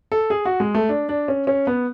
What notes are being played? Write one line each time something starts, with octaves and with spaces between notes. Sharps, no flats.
A4
G#4
F#4
G#3
A3
D4
D4
C#4
C#4
B3